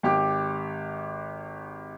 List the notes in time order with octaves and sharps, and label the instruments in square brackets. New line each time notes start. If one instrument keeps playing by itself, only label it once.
[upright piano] G#1 G4 D6